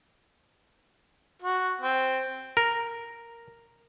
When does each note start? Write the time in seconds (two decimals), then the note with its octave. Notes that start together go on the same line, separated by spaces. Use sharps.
1.42 F#4
1.81 C4
2.57 A#4